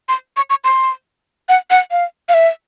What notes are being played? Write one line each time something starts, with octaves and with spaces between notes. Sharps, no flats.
C6
C#6
C#6
C6
F#5
F#5
F5
F5
E5